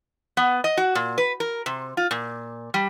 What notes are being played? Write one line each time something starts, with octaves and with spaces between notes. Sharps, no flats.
B3
D#5
F#4
A#2
B4
A#4
C3
F4
A#2
G3